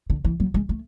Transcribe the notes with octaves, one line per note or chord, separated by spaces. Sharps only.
D3
E3
F#3
G#3
A3